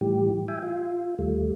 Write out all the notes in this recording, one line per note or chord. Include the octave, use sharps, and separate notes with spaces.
A2 E3 G3 G4
E5 G5 G#5
F4
D#2 G3 A3